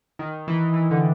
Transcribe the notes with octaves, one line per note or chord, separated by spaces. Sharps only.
D#3
E3
E3
D3